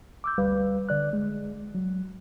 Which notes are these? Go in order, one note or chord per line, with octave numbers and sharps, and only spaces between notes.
D6 E6 G6
D2 G3 B4 F5
D3 D5 F#6
G#3
F#3